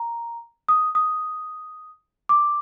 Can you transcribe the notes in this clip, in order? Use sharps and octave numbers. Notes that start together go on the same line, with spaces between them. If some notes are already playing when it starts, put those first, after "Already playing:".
Already playing: A#5
D#6
D#6
D6